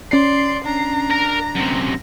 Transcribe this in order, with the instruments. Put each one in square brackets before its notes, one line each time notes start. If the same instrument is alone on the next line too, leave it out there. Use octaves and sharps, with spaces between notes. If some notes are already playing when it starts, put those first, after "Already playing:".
[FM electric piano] C#4 C7 [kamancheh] D5 C6
[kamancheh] D4 A#5
[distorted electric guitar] A#4 [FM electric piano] A#6
[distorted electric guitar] F#2 C3